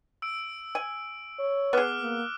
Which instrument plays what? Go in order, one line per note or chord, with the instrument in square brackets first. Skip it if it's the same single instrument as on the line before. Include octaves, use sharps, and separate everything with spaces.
[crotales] E6 D7
[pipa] G#5
[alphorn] C#5
[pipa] B3 G#4 [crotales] D6 F6 F#6
[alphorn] A#3